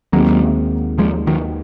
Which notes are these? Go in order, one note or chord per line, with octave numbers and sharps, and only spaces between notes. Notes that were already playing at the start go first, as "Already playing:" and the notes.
D#2 D#3 F#3 G#3 A#3 C4 F#4
F3 G#3
D#3 F#3